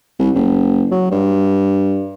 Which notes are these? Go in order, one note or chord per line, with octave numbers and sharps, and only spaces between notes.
C2
F#1
F#3
G2